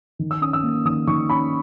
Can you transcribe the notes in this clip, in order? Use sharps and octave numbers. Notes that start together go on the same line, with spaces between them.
D#3
E6
C#4 D#6
E6
A#3
D#3 D#6
D#3 C#6
C#4 B5